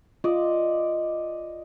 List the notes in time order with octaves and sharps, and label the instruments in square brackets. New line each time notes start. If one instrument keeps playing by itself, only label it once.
[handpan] F4 [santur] D5 D#5